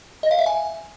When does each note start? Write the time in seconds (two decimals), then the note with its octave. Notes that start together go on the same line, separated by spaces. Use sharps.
0.23 D#5
0.31 F5
0.39 E5
0.46 G#5